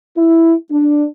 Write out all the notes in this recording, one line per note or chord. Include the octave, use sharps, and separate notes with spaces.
E4
D4